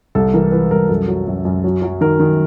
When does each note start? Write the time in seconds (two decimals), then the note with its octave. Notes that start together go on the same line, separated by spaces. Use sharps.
0.15 C2 A4
0.34 E3 A#4
0.52 E3 B4
0.71 C2 A#4
0.89 F#2 A4
1.08 F#3
1.27 F#2
1.45 F#2
1.64 F#3
1.82 F#3
2.01 D#3 A#4
2.20 D#3